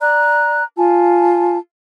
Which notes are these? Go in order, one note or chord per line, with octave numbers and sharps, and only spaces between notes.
D5 A#5 F#6
F4 G#5 A5